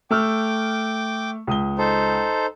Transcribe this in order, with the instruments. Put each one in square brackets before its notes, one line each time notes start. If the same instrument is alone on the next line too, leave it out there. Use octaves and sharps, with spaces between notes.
[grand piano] A3 E6 F6 [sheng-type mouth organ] G5 D6
[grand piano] C#2 D#6 G7
[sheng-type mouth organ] D#4 A4 C5